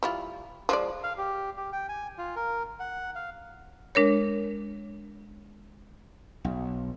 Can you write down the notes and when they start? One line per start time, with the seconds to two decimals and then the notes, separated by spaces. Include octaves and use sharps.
0.03 G3 E4 F4
0.69 F3 G#3 D5
1.04 F5
1.18 G4
1.57 G4
1.72 G5
1.89 G#5
2.18 F4
2.36 A#4
2.80 F#5
3.15 F5
3.95 G#3 D4 A#4 C#5
6.45 B1